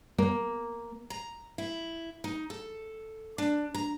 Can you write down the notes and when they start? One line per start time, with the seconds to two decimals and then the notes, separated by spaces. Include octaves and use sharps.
0.18 A#3
1.10 A#5
1.58 E4
2.24 D#4
2.50 A4
3.38 D4
3.74 A#5